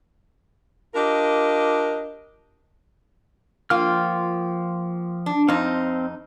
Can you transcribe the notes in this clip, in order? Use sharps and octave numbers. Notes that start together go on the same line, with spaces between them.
D4 F4 G4 A#4 D#5
F3 A#3 F4 G5 F6
D4
F2 C4 D#4 F5